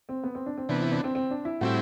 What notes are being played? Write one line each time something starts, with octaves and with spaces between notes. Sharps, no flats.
C4
B3
C4
D4
C4
C3 E3 B3 D4
E4
D4
C4
C4
D4
E4
A2 G3 C4 E4 F#4